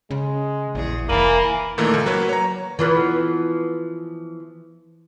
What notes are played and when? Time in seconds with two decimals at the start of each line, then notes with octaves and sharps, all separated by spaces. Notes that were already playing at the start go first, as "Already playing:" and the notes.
0.11 C#3 G#3
0.75 A#1 E2 G#4
1.09 F1 E3 A#3 E4 G#5 B5
1.78 A#2 D#3 E3 A3 A#3
1.94 C#2
2.06 F#3 A#3 B4 C#5
2.29 C#5 A#5
2.79 E3 F3 B3